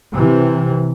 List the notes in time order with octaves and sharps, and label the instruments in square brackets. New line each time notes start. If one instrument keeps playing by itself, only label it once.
[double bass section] C3 E3